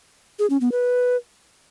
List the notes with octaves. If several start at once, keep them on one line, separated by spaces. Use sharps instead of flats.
G#4
C#4
B3
B4